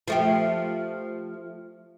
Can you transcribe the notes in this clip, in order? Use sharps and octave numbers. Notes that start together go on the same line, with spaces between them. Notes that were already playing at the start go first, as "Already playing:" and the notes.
F3 A3 G4